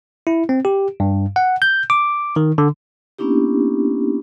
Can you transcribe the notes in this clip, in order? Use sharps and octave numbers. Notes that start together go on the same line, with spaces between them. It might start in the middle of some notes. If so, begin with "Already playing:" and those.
E4
C4
G4
G2
F#5
G6
D6
D#3
D3
A#3 B3 C#4 D4 E4 G4